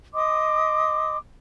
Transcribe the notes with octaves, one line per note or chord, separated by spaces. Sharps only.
D#5 C6 D6 D#6